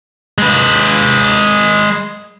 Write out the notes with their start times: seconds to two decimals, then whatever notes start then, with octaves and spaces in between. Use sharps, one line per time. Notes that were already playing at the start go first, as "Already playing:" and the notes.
0.38 G#3 B4